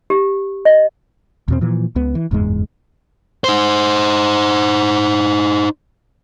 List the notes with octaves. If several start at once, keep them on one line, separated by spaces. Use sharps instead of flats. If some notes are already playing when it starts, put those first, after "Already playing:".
G4
D#5
E2 B2 C4
A#2 E3 F3
C#2 B3
E3
F#1 E2 G#2 G#3
D#4 C5